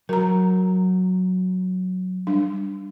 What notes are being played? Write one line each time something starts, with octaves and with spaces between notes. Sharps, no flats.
F#3 A#4 A#5
G3 D4